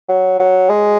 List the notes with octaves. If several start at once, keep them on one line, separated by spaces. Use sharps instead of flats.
F#3
F#3
G#3